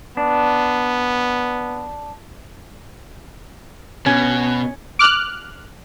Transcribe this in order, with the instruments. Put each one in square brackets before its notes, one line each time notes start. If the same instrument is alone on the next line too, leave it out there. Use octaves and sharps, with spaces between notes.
[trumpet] B3 [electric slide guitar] D4
[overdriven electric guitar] B2 [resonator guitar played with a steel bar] C#4
[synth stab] D6 F6 F#6